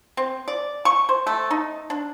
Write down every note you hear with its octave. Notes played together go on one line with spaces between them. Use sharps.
C4
D5
C#6
C5
A3
D#4
D4